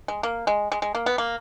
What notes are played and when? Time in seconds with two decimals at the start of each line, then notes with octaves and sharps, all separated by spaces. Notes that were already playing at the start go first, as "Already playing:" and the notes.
0.08 G#3
0.23 A#3
0.47 G#3
0.72 G#3
0.82 G#3
0.95 A#3
1.06 B3
1.18 A#3